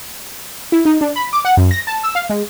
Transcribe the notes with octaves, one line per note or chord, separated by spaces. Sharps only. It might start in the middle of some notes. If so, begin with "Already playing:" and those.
E4
D#4
D4
B5
D6
F#5
F#2
A#6
A5
E6
F5
G#3